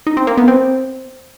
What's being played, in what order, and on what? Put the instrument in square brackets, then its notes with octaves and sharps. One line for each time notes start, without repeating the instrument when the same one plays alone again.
[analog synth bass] D#4
C4
A#3
B3
C4